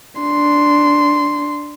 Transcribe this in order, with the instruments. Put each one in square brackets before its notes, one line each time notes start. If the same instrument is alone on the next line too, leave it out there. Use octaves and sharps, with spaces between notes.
[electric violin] D4 C6